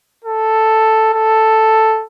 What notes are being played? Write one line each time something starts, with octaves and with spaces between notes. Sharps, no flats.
A4
A4